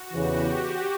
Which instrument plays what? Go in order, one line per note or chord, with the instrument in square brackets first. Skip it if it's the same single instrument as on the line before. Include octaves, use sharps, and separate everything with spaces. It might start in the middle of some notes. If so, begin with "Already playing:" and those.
Already playing: [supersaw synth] F#4
[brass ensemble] E2 C#3 E3 [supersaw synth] G4